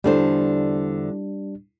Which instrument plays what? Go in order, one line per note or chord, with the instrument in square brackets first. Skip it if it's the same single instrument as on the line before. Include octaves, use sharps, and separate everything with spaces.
[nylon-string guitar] E2 D3 C5 [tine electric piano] G3 D4